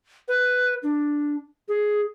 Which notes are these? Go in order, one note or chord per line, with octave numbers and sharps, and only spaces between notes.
B4
D4
G#4